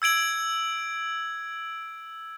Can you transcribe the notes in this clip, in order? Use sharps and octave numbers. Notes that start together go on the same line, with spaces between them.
E6 G#6 D7 F#7